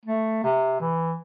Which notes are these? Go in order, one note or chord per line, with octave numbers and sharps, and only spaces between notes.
A3
C3
E3